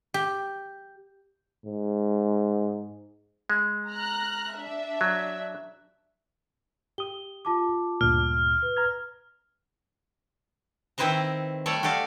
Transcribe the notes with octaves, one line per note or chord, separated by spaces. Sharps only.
G4
G#2
G#3
A#5 F6 F#6
D4 E5
F#3
G4 D#6 G7
F4 A5 D6
D2 G2 A#2 F6
B4
A#5 F6 G#6
D#3 C4 E4 B4 C5 A#5
G3 A3 A4 C#5 D5
F#4 G4 A4 D5 F5